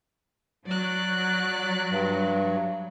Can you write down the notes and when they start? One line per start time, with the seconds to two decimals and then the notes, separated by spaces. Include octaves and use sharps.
0.67 F#3 D5 F#6
1.91 G2